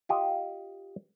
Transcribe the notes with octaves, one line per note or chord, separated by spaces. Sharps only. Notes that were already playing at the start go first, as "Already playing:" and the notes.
F4 G4 D#5